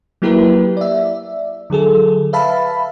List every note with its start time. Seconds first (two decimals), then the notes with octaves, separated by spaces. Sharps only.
0.22 F#3 A#3 E4 G4 A#4 B4
0.77 D5 E5
1.70 D3 F#3 G#4 A4
2.33 B4 E5 F5 A5 B5